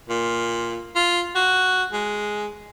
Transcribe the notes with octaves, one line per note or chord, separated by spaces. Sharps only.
A#2
F4
F#4
G#3